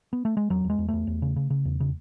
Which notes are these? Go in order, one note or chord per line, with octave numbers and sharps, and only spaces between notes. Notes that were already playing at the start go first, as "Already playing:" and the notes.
B3
A3
G#3
E2 F#3
E2
G#3
E2
E2 A3
E2
C#3
C#3
C#3
E2
C#3